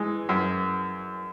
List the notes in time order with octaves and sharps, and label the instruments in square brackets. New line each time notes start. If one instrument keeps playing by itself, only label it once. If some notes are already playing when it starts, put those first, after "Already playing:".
Already playing: [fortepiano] E3 G#3
F#2